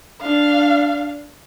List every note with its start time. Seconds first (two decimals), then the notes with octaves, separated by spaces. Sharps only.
0.22 D4 F5